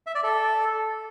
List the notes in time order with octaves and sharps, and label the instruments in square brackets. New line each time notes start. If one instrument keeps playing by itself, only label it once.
[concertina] E5
D5
A4